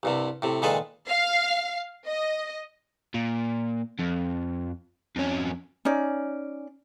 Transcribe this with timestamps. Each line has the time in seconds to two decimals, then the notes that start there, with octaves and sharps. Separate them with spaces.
0.03 C2 G2 C3
0.42 A2 C3
0.62 A#2 D#3 G#3 G#4 A4 B4
1.07 F5
2.07 D#5
3.14 A#2
3.99 F2
5.16 F2 C#4
5.85 C#4 D#4 D5